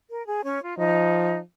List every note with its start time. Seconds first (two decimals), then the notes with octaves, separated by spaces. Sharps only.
0.10 A#4
0.27 G#4
0.44 C#4 C#5
0.61 F4
0.78 F3 D#4